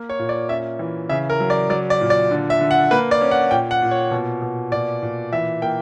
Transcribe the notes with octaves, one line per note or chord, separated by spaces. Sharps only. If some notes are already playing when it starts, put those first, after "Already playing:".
Already playing: A#3
C#5
A#2
D5
C#4 E5
E3
C#3 E5
A#4
F#3
D5
F#3 D5
D5
A#2
D5
D3
E5
D3
F#5
A#3 B4
D5
C#4
F#5
A#2 G5
F#5
A#2
C#5
B2
B2
A#2 D5
A#2
E3 E5
A#3 G5